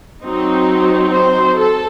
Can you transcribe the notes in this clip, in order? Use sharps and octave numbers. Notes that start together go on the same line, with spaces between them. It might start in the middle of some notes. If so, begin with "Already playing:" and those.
F#3 C4 D#4
C5
A4